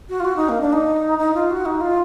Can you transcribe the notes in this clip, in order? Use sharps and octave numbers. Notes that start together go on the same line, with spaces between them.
F#4
F4
F#4
D#4
A#3
D4
D#4
D#4
F4
F#4
D#4
F4